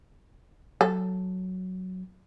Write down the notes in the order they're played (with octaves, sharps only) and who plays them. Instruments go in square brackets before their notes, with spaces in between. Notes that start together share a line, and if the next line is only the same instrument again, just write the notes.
[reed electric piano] F#3 [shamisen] A4